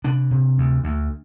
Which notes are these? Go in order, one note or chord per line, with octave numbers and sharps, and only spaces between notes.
C3 D4
C3
D2
D2